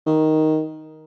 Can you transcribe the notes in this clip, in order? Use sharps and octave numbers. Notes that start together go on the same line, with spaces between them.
D#3